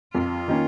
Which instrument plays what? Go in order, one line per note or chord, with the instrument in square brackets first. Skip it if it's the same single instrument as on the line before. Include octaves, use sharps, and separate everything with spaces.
[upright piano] F2 [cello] F4
[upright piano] D#3 A#3 C#4